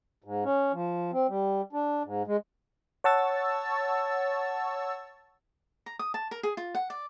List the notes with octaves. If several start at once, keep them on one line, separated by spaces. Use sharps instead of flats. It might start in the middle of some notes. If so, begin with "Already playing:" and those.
G#2
C#4
F3
C4
G3
D4
G#2
G#3
C#5 F#5 A5 C#6 E6 A6
A#5
D#6
A5
A#4
G#4
F4
F#5
D5